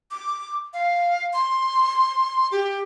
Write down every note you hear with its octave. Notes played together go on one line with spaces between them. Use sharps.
D6
F5
C6
G4